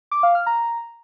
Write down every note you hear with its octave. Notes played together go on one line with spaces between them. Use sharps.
D6
F5
F6
A#5